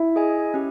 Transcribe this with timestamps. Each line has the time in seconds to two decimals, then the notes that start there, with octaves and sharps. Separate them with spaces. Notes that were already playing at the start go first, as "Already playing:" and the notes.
Already playing: E4
0.16 G#4 D#5 G#5
0.54 C#4 G4